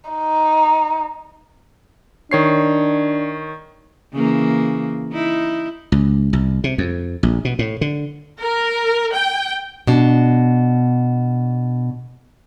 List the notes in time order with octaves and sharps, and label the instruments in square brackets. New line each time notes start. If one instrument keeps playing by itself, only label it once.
[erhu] D#4
[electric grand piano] D#3 C#5 C7 [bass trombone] D4
[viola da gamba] C#3 E3 A#3
D#4 E4
[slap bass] C#2
C2
C3
F2
A#1
B2
A2
D3
[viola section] A#4
G5
[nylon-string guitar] B2 D4